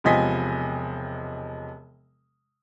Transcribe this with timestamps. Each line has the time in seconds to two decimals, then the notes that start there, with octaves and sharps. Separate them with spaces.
0.04 E1 C3 F3 D#5 G#5 B6